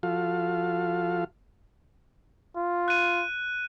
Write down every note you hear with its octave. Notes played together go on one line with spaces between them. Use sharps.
F3 F4 F#4 A4 F5
F4
F#6 D#7